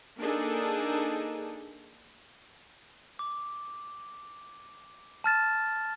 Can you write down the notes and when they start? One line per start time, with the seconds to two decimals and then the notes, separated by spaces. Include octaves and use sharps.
0.19 A#3 D4 D#4 G#4 A4
3.19 D6
5.24 A5 F6 A6 E7